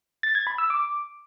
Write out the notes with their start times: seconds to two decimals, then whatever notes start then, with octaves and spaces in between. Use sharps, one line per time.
0.23 A6
0.35 G#6
0.47 B5
0.58 E6
0.70 D6